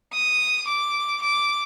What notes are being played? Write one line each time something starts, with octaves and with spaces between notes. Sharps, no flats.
D#6
D6
D6